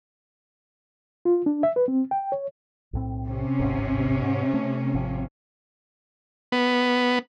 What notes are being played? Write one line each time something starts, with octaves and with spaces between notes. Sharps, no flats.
F4
D4
E5
B4
C4
G5
C#5
B1 A2 C4
C3 C#4
D1 G#1 G#2
G#2
A3
G#1 F3 C4
B3